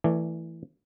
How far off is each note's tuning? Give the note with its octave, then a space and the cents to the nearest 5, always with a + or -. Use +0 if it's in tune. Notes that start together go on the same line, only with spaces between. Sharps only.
E3 +0 A3 +25 D5 +10